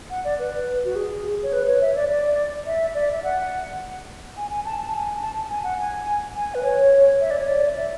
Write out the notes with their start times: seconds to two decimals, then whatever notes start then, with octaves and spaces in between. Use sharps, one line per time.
0.10 F#5
0.25 D5
0.39 B4
0.85 F#4
0.96 G#4
1.43 C#5
1.53 B4
1.67 C#5
1.81 E5
1.95 D5
2.09 D5
2.67 E5
2.95 D5
3.12 E5
3.23 F#5
4.37 G#5
4.51 G#5
4.65 A5
4.79 A5
4.93 G#5
5.21 A5
5.49 G#5
5.64 F#5
5.78 G#5
6.35 G#5
6.55 B4
6.63 C#5
7.21 E5
7.30 D5
7.39 C#5
7.48 D5
7.77 E5